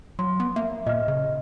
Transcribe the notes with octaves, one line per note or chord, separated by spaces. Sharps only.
F#3 C6
B3
A#3 E5
A#2 D#5 F6
C#3